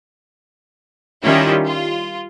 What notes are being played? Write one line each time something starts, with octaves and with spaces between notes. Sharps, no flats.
D#3 G3 C#4 E4 F4
F4